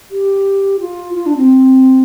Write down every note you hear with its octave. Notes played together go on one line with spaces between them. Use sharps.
G4
F4
F4
D4
C4